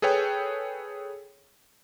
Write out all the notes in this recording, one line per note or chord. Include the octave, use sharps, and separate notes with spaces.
G#4 A4 B4 C#5 G5